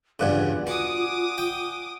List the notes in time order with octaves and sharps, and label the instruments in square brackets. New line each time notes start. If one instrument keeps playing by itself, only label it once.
[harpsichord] E2 G2 C#3 [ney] F4 [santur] D5 F#5 G#5
[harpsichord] F#4 [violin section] D6 D#6
[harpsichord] G5